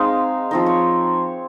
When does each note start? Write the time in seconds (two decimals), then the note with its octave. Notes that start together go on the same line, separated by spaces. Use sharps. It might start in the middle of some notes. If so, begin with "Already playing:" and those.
Already playing: G#3 C4 D#4 F5
0.51 F3 C4 D#4 D#5
0.66 C#5